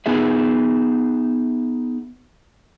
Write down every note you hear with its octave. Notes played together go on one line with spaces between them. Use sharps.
B3 D#4 G#4 E5